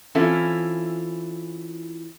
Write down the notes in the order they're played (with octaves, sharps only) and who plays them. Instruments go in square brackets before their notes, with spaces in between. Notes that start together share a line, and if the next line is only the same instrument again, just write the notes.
[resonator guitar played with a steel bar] E3 C4 C#4 E4 F4 A4